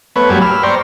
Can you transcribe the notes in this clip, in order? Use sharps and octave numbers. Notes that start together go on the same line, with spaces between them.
A3 B3 B4 C#5
F#2 F#3 G3 A#3 G4 G#5
B5 E6 F6
C5 D5 G5 A#5 C6 C#6